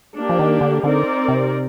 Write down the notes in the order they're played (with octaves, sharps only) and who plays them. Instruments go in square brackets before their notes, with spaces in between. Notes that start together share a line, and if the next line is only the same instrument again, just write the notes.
[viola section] A#3 D4 G4
[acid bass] F3
D#3
D3
[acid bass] D3 [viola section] C4 D#4 A#4 D5
[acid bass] C3